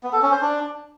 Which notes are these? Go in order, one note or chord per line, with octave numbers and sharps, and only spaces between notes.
B3
A4
C#4
C5
D4